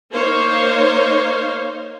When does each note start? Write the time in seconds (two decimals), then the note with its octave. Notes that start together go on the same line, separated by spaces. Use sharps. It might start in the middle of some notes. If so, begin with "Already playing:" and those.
0.11 A#3 D#4 C5 C#5 F5